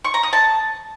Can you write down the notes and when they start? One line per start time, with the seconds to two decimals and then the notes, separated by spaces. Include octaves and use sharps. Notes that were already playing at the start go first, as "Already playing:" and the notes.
0.04 C#6
0.14 A#5
0.23 D#6
0.33 A5